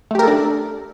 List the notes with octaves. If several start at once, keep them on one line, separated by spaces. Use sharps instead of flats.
A3 D4 G4 A4 A#4